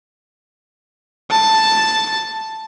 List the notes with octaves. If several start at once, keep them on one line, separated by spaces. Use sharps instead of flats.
A5